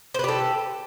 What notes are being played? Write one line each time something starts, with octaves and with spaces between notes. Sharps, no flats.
G4 A4 B4 C5